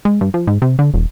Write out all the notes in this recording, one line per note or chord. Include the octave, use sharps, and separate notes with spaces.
G#3
G2
F3
G#2
C3
D3
E1